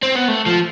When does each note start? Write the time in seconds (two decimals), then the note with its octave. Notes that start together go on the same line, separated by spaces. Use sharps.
0.03 C4
0.16 B3
0.28 A3
0.46 F3